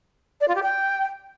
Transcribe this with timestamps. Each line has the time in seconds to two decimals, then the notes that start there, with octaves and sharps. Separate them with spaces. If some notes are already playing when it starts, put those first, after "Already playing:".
0.40 D5
0.47 F4
0.55 G4
0.62 G5